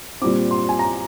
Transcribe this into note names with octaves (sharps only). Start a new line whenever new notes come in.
A#2 G3 C4 D6
C6
G#5
A#5